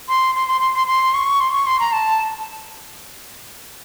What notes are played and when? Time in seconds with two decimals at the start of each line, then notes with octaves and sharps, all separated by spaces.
0.09 C6
0.35 C6
0.48 C6
0.61 C6
0.75 C6
0.87 C6
1.14 C#6
1.41 C6
1.53 C#6
1.67 C6
1.80 A#5
1.93 A5